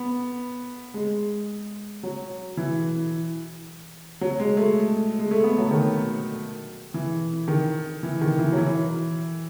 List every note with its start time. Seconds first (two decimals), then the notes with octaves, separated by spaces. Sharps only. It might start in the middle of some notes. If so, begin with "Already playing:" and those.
Already playing: B3
0.94 G#3
2.03 F#3
2.57 E3
4.21 F#3
4.40 G#3
4.57 A3
5.19 G#3
5.31 A3
5.44 B3
5.58 F#3
5.71 D#3
6.94 E3
7.48 D#3
8.03 E3
8.21 D#3
8.39 E3
8.52 F#3
8.57 E3